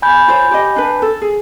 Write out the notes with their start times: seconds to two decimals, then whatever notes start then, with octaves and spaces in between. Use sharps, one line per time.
0.02 G#5 B5 G6
0.28 F4 C5 C#5
0.51 G4 D#5
0.76 D4 B4
1.02 A4
1.22 G#4